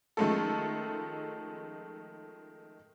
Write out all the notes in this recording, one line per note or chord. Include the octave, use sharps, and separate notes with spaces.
D#3 F3 G#3 A3 C#4 A4